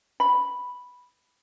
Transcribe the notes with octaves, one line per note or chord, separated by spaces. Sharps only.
B5